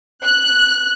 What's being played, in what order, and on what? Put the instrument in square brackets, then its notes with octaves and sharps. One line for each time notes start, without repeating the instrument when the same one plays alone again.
[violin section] F#6